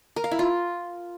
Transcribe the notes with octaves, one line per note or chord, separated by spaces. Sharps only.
A#4
F5
E4
F4